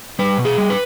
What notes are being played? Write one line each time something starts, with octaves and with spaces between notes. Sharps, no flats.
G3 B4
B2
G#4
G3
B4